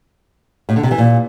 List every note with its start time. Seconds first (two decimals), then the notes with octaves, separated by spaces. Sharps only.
0.69 A2
0.76 D3
0.83 C3
0.91 E3
0.98 A#2